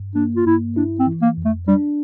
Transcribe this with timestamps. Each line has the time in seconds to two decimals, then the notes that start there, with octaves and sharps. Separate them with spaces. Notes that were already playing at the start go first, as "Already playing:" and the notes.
Already playing: G2
0.15 A#3 D4
0.37 F4
0.45 G2 E4
0.76 D4 E4
1.00 C4
1.07 E3
1.22 A#3
1.37 F2
1.45 A3
1.68 G3 D4